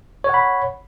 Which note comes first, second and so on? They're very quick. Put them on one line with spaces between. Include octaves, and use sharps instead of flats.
C#5 F#5 B5